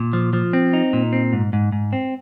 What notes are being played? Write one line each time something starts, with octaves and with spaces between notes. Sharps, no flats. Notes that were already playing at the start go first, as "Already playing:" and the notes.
Already playing: A#2
F3
F3
C4
D#4
A#2
C4
G#2
G#2
G#2
C4